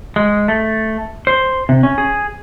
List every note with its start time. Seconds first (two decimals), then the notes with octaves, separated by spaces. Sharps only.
0.16 G#3
0.48 A3
1.27 C5
1.69 C3
1.83 C#4
1.98 G#4